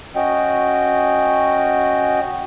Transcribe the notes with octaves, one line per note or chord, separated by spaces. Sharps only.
C#4 F#4 D#5 G5